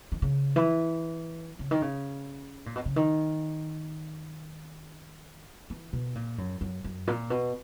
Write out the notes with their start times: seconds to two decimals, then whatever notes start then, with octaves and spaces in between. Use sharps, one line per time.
0.12 D#3
0.22 C#3
0.56 E3
1.59 C#3
1.71 D#3
1.82 C#3
2.66 A#2
2.76 B2
2.86 C#3
2.96 D#3
5.70 E3
5.93 B2
6.15 A#2
6.38 F#2
6.61 F#2
6.84 F#2
7.07 A#2
7.30 B2